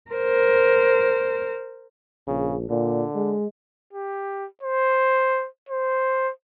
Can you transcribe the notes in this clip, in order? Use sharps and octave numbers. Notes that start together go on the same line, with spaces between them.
A#4 C5
A#1 C#3
A#2 D3
G#3
G4
C5
C5